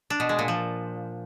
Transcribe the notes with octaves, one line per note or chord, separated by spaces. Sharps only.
D4
B2
G#3
A#2
F3